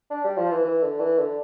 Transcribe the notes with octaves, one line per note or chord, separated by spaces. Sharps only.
D4
G3
F3
E3
E3
D3
E3
D3